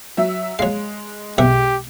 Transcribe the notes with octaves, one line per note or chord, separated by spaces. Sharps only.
F#3 E5
F#3 G#3 F5
B1 G4 E5 F#5